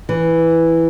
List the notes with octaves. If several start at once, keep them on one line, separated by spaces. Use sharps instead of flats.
E3